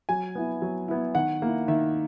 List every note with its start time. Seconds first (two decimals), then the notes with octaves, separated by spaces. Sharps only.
0.09 F#3 G#5
0.35 B3 E4
0.62 F#3
0.88 B3 E4
1.15 D#3 F#5
1.42 A#3 E4
1.68 D#3 E5